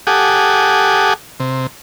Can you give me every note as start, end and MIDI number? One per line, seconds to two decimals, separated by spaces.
0.07 1.13 67
0.07 1.13 69
0.07 1.13 78
0.07 1.13 80
0.07 1.13 86
0.07 1.13 87
1.40 1.67 48